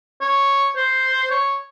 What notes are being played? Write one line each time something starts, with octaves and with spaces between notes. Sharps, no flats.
C#5
C5
C#5